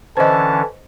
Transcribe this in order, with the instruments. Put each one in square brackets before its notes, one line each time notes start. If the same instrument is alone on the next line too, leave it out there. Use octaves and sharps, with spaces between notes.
[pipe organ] D3 E3 C#4 [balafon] C5 D#5 [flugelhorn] A5